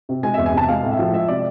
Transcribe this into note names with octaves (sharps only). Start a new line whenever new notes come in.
C3
G#3 G#5
E2 E5
G#5
C3 A5
G#3 F5
A2
E5
F3
G#3 E5
C3 D5